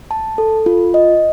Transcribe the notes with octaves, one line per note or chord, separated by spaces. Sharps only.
A5
A4
F4
D#5